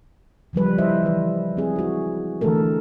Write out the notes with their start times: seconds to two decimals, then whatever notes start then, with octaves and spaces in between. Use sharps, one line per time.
0.53 C#3 F3 G3 B4
0.78 E4 C5 D#5 E5
1.03 E3 B4
1.57 C4 G#4
1.76 E4 F#4
2.41 D3 E3 A3 A4 A#4